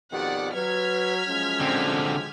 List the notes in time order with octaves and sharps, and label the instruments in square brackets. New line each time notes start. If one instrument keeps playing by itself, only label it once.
[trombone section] F2 B2 D#3 [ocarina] G4 [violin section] D5 F#5
[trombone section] F#3 [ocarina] B4 [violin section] F6 G#6 B6
[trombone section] F3 F#3 G#3 [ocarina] C#4
[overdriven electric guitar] D3 C4